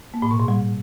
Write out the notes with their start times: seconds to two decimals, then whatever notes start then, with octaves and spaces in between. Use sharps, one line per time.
0.14 A#3
0.22 A2
0.31 B2
0.40 A#2
0.48 G3